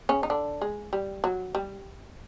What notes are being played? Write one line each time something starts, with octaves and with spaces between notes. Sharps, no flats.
C#3 C#4
D#4
D3 D4
G#3
G3
F#3
G3